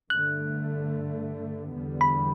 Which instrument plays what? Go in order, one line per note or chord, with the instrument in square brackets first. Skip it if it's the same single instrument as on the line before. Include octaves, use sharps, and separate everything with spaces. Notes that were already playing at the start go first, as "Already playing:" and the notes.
[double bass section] G2 D3 A3 [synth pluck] F#6
[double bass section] E2 D3 G3 B3
[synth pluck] B5